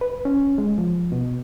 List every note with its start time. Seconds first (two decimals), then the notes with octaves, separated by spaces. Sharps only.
0.01 B4
0.25 C#4
0.58 G#3
0.78 F3
1.12 B2